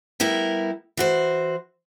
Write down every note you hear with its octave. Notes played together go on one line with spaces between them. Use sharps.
G3 B3 E4 A#4
E3 F#4 C5